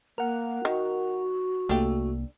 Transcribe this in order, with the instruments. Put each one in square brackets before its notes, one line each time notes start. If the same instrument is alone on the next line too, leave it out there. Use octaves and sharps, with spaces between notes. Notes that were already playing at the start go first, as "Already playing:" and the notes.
[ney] A#3 [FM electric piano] A#4 F#5
[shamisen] D#3 [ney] F#4
[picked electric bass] C2 A#3 [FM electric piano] A3 [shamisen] D4 G4